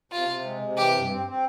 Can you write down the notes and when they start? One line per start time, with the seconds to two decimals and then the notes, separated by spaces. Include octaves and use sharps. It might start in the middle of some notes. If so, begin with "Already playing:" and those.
0.12 C3 F4
0.29 C3
0.44 G#3
0.62 C3
0.77 E3 G4
0.94 G2
1.10 C4
1.26 C4